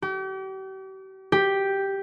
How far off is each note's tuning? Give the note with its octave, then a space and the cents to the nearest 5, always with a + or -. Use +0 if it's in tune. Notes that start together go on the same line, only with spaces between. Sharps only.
G4 -40
G4 +0